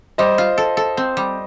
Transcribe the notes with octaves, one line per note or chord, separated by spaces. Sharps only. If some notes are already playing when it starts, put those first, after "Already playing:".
G3 C5 D#5
F4
A4
A4
C4
G3